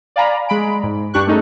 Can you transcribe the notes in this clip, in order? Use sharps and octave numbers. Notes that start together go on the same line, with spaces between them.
D5 F5 G#5 A#5 B5
G#3 B5 D7
G#2
G2 D4 G4 C#6 F#6
A3 C#4 D#4 G#4 A4